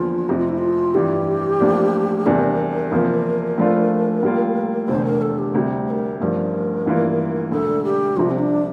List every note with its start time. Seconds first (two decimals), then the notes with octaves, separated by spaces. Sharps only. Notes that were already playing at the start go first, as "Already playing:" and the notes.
Already playing: E2 D3 F3 A#3 D4 F4
0.29 F1 F2 C3 G4
0.38 F4
0.48 E4
0.58 F4
0.94 G2 E3 G3 G4
1.60 A1 A2 F3 A#3 D4
2.26 E2 C3 G3 D4 A#4
2.92 E2 C3 F3 A#3 F4
3.58 A2 F3 A3 D4 F4
4.23 A2 G3 A#3 F4
4.88 F1 E2 D3 C5
5.05 A#4
5.22 A4
5.38 G4
5.54 D2 C3 G3
5.87 C5
5.91 A#4
6.20 A1 G2 F3 A#4
6.86 A1 G2 E3 A#3 F4
7.51 E1 D2 D3 A4
7.84 G4
8.17 C2 C3 F3 F4
8.30 C4
8.39 D4